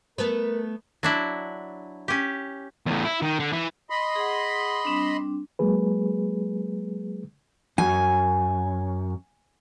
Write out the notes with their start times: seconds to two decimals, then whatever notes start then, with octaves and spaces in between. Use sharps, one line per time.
0.18 A3 B3 A#4 B4
1.03 F#3 D4 E4
2.08 C#4 G4
2.86 E2 A2
3.05 E4
3.22 D#3
3.39 D3
3.53 E3
3.90 D#5 B5 C6
4.16 G#4 F#5
4.85 G3 C4 D4
5.59 F#3 G#3 A#3 G#4 B4
7.78 F#2 G#5